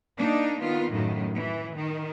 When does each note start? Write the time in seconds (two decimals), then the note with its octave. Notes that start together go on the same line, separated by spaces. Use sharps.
0.16 A#3 D4 D#4
0.59 D#3 B3 F4
0.91 F#2 A2 D#3
1.34 E3
1.76 D#3